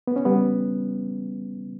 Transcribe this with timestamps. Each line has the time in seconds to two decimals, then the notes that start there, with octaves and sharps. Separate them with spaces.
0.07 B3
0.16 C#4
0.25 G3 B3